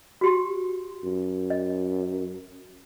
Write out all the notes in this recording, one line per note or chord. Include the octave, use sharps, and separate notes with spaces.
F#4 G4 C6
F#2
D#5